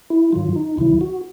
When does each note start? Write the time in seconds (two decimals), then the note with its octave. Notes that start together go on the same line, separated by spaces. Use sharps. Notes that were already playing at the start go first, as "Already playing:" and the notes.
0.10 E4
0.32 G2 D#3 F#3 F4
0.56 D#4
0.77 D2 C3 D#3 F#3 E4
1.01 F#4